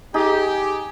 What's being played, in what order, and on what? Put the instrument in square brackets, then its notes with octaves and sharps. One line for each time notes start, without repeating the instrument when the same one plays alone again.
[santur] D#4 G#4 [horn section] G4